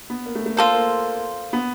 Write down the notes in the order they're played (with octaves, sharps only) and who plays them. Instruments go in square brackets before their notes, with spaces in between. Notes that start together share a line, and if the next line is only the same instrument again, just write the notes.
[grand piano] B3
A#3
A3
A3
[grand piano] A#3 [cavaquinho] F4 A4 C5
[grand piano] A#3
B3